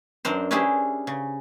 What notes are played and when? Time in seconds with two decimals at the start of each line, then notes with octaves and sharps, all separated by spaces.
0.25 F#2 D4 A#4 C5
0.51 C#4 D4 E4 G4 G#4 C5
1.07 C#3